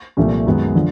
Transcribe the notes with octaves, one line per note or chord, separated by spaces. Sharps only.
C2 A#2 F3 A3
F#2 D#3 G#3 B3
D3 F3